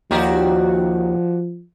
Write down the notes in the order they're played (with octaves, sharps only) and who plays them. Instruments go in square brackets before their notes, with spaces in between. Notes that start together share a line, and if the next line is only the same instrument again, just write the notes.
[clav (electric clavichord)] D#2 D#3 G4 [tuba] F3 [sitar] F#4 D5